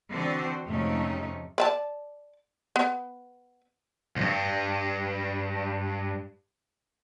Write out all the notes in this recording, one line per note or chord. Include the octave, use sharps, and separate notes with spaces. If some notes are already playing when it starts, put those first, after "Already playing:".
D3 E3 C4 F#4 C5
F2 G#2 C3 A3 C#4 D#4
D5 E5 A5
B3
C2 G2